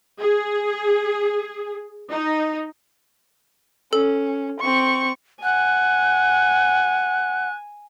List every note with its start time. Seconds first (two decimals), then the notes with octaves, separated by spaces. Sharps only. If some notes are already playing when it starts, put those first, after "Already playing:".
0.20 G#4
2.11 D#4
3.93 C#4 A4
4.60 C4 C#6
5.43 F#5 G#5 F#6